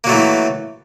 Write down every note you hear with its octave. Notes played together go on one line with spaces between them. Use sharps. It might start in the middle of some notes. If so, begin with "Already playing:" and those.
E3 F#3 A3 A#3